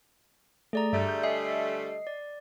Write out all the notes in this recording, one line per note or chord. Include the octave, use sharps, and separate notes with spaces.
A3 G#4 D5 A#5
G2 D3 G3 A3
G6
A4 D#5 E5 G#5 C7
D5